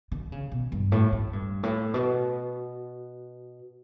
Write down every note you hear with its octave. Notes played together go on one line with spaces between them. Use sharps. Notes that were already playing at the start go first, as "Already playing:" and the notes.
D3
C#3
B2
G2
A2
A2
G2
A2
B2